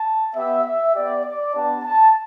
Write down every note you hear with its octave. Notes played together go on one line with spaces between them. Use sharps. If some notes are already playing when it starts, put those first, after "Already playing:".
Already playing: A5
B3 G4 E5
E5
B3 G4 D5
D5
B3 D4 G4 A5
A5